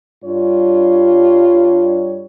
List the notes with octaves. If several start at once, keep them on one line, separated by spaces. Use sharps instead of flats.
G2 G3 D4 F4 C#5